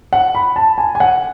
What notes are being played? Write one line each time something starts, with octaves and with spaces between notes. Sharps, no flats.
F#5
B5
A5
G#5
G#5
F#5